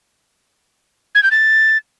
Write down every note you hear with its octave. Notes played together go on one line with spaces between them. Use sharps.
G#6
G6
A6